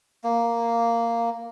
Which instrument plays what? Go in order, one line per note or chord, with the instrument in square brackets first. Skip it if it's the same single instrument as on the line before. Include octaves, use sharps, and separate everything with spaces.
[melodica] A#3